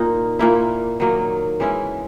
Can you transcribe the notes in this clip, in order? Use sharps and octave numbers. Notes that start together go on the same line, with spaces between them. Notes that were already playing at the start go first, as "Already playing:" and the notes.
Already playing: A#2 A#3 D#4
A#2 A#3 E4
D#3 F#3 A#3
E3 G#3 C#4 E4